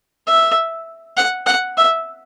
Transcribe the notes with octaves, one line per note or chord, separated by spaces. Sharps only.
E5
F#5
F#5
E5